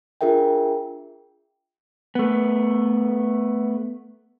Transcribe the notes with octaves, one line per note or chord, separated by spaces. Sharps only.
D4 F4 G#4 A#4 E5 G5
A3 B3